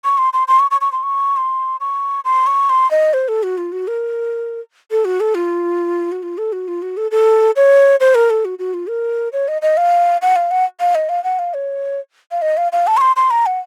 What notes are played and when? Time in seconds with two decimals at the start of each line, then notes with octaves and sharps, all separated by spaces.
0.04 C#6
0.18 C6
0.33 C6
0.48 C6
0.59 C#6
0.71 C#6
0.81 C#6
0.92 C6
1.03 C#6
1.37 C6
1.80 C#6
2.25 C6
2.47 C#6
2.70 C6
2.91 D#5
3.13 C5
3.28 A4
3.43 F#4
3.58 F4
3.72 F#4
3.88 A#4
4.91 A4
5.05 F#4
5.20 A4
5.35 F4
6.12 F#4
6.23 F4
6.38 A4
6.53 F#4
6.68 F4
6.82 F#4
6.97 A4
7.11 A4
7.56 C#5
8.00 C5
8.15 A#4
8.30 A4
8.45 F#4
8.59 F#4
8.74 F4
8.89 A#4
9.33 C#5
9.48 D#5
9.62 D#5
9.77 F5
10.22 F#5
10.36 F5
10.51 F#5
10.80 F5
10.95 D#5
11.09 F5
11.24 F#5
11.39 F5
11.54 C#5
12.32 F5
12.42 D#5
12.57 F5
12.73 F5
12.87 A5
12.97 C#6
13.01 C6
13.16 C6
13.31 A#5
13.46 F#5